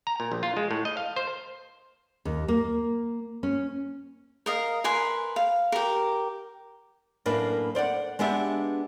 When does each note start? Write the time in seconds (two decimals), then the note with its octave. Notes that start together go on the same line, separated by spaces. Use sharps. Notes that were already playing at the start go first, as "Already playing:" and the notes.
0.07 A#5
0.20 A#2
0.32 A#1
0.43 F4
0.57 G#3
0.71 A2
0.85 D#5
0.97 F5
1.16 C5
2.25 D#2
2.48 A#3
3.43 C#4
4.46 A#4 D#5 F5
4.84 A#4 B4 G#5 C6
5.36 F5
5.72 G4 A#4
7.26 F#2 A2 A#3 D4 B4
7.75 C5 D5 F5 F#5
8.19 G#3 B3 D4 G4 E5